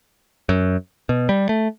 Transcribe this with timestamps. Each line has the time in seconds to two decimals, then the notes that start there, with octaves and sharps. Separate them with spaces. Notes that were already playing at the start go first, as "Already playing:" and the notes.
0.49 F#2
1.09 B2
1.29 G3
1.49 A3